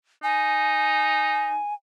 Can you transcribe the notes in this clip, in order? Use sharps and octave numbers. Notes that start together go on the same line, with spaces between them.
D#4 G#5